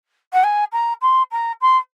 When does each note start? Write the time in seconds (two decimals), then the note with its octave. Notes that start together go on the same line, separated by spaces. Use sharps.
0.33 F#5
0.43 G#5
0.72 A#5
1.02 C6
1.31 A#5
1.61 C6